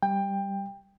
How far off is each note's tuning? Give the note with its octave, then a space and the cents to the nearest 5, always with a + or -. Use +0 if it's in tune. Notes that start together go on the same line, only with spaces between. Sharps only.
G3 +0 G5 +20